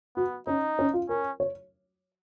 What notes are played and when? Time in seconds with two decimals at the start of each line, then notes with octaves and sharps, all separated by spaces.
0.16 B3 F#4
0.47 C#4 D#4
0.79 C#4
0.93 F4
1.09 C#4 A#4
1.40 C#5